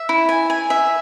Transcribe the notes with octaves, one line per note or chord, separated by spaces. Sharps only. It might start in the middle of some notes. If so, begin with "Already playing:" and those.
Already playing: E5
E4
G#5
G#5
E5